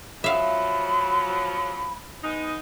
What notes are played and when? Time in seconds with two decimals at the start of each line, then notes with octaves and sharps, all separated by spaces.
0.24 F3 F#3 E5 F5 B5
2.23 G#3 B3 D#4